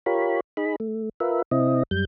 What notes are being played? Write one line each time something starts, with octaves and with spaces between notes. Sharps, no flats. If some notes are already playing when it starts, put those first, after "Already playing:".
F4 G4 A#4 C#5 B5
D#4 G#4 B5
A3
F4 A#4 B4 E5
C3 C4 E4 D#5
F#2 G3 G6